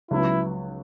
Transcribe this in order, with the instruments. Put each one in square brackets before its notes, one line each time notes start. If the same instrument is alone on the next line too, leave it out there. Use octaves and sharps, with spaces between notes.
[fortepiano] C#2 C#3 F#3 B3 [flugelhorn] E4